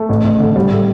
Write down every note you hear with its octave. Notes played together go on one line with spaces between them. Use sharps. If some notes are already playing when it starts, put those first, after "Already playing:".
Already playing: A3
A1
A1
D3
G3
A2